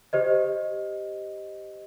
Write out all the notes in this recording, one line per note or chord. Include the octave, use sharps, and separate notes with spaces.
G4 C5 D#5